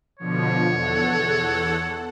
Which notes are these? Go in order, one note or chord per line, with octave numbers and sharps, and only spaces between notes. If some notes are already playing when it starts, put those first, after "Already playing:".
B2 D3 F3 C#5
E2 A4 F#5